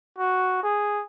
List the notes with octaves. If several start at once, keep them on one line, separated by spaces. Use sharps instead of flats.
F#4
G#4